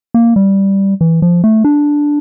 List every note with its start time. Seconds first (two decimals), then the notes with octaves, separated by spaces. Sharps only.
0.14 A#3
0.36 G3
1.01 E3
1.22 F3
1.44 A3
1.64 D4